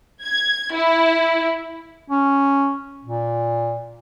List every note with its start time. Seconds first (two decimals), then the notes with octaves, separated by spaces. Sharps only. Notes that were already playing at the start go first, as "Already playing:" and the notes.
0.22 G#6
0.73 E4
2.10 C#4
3.04 A#2